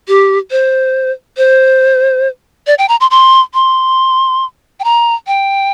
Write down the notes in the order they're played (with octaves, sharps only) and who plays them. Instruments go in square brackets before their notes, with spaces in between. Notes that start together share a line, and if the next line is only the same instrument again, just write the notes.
[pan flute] G4
C5
C5
D5
G5
A#5
C6
C6
C6
G5
A#5
G5